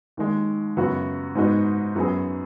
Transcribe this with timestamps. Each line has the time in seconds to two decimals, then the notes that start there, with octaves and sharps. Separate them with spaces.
0.17 D#2 D#3 G#3
0.77 F#2 C#3 B3 F#4
1.35 G#2 G#3 B3 D#4 F#4
1.95 F#2 F#3 B3 G#4